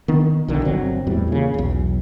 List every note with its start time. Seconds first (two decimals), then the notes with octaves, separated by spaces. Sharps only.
0.08 D#3 B3 D4
0.48 B1 D3 D#3
0.65 G1 F#3 C4
1.07 E2 A2 G3
1.28 A#2 C#3
1.54 B1 E2